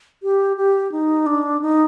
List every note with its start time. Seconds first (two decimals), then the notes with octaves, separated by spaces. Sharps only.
0.23 G4
0.57 G4
0.92 D#4
1.26 D4
1.62 D#4